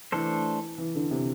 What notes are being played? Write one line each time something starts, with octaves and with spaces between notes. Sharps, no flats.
E3 A3 D4 A4 C5
E3
D3
C3